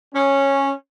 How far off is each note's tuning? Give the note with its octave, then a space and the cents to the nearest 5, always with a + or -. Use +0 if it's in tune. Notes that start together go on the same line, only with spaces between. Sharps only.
C#4 -10